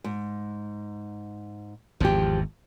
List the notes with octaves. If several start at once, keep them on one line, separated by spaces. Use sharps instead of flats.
G#2
G#1 E2 F3 G4